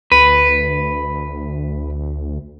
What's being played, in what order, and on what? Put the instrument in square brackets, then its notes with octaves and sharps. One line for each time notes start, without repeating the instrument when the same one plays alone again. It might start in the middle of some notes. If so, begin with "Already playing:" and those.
[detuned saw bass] D2 [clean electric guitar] B4